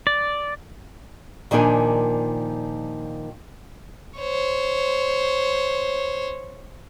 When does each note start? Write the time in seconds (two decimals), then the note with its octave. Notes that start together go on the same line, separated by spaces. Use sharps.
0.07 D5
1.51 A#2 D#3 F3 D4 A#4 G#5
4.19 C5 C#5